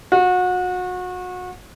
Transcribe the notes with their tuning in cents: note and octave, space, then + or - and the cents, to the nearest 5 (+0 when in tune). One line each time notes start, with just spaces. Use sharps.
F#4 -30